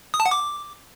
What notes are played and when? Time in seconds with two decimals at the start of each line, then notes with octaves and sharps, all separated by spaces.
0.14 D#6
0.20 A5
0.26 F#5
0.31 D6